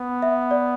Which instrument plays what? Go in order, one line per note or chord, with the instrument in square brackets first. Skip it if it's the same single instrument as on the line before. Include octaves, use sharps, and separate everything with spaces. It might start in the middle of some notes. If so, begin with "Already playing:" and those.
Already playing: [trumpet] B3
[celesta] E5
D5